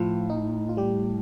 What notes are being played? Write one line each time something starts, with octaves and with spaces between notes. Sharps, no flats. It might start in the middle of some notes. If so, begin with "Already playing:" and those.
Already playing: A2 F3 F4
D#4
F4
G3 G4